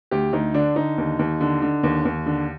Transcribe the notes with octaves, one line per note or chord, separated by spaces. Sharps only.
D2 G4
D2 D#4
D3 D4
D3 D#4
D#2
D#2
D3
D3
D#2
D#2
D3